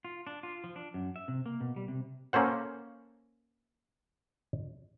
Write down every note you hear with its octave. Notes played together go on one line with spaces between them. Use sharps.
F4
D4
F4
F3
D4
F#2
E5
C3
A#3
B2
G3
C3
A#3 C#4 A4 C5 F#5